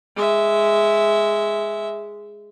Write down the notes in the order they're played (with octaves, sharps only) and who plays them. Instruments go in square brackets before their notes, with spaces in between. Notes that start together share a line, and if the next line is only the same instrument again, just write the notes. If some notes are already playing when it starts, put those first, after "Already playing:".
[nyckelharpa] G#3 E5